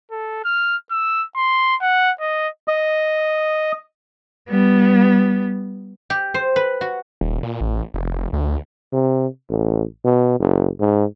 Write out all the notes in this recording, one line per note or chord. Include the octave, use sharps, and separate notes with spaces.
A4
F6
E6
C6
F#5
D#5
D#5
G3 B3
G4
C5
B4
F#4
D#1
A#2
A1
F1
D2
C3
A1
B2
F#1
G#2